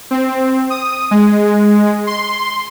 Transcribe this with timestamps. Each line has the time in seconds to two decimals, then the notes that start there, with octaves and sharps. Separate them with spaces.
0.11 C4
0.70 D#6
1.11 G#3
2.07 C6